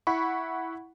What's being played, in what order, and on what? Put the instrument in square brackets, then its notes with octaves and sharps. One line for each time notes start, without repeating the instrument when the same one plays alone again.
[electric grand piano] E4 F#5 B5 C#6